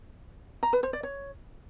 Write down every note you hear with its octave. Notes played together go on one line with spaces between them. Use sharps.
A#5
B4
C5
D5
C#5